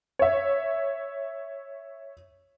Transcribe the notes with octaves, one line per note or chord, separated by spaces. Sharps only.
C#5 E5